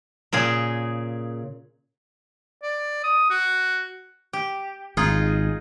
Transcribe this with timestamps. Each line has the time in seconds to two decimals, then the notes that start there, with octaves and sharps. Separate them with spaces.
0.33 A#2 C#3 G#4
2.63 D5
3.04 D#6
3.30 F#4
4.33 G4
4.97 G#1 D#4 F4 G#4